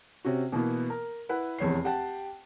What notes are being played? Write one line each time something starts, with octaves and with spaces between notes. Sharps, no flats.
C3 C#4 F#4
B2 E3 A#3 B3
A#4
E4 B4 F#5
F1 E2 C#5 C7
G4 F#5 G5 A5